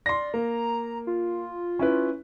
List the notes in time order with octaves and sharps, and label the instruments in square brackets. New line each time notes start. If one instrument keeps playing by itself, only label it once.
[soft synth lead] D5 [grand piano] C6 A#6
[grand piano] A#3 [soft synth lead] A#5
[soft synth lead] F4
[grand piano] C#4 E4 B4